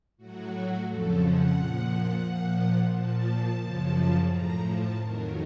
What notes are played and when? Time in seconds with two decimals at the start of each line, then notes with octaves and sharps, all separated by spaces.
0.17 A2 F#3 F#4
0.86 F2 C#3 F3 A4
1.20 F#5
1.55 A#2 F3
2.23 A#2 F3
2.92 A#2 F3 A5
3.60 F#2 C#3 F3
4.29 A2 F3 A#5
4.64 A5
4.98 F2 D#3 F#3 A#4